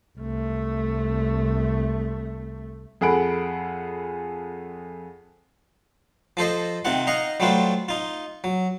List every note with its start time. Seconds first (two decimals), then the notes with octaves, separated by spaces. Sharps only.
0.17 C2 A3
3.01 F2 G#4 A4 F#5 B5 D7
6.37 F3 A4 C5 D#5
6.85 C3 D#3 F4 F#5
7.07 D#4 D#5 F5 F#5
7.40 F#3 G3 A3 F4 F#4 C5
7.89 D#4 F4
8.44 F#3